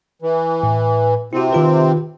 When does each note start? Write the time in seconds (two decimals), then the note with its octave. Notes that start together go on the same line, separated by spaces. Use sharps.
0.22 E3
0.63 A2
1.33 C3 C4 E4 F#4
1.53 D#3 F4 B4